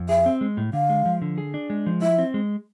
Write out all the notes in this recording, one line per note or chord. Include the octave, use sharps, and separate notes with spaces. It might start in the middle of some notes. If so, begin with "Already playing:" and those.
Already playing: F2
G#4 E5
C4
G#3
A2
D3 F5
G#3
F3
D3
G#4
D4
G#3
F3
E4 E5
C4
G#3